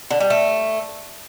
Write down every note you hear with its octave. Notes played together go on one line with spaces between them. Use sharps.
D3
G3
A3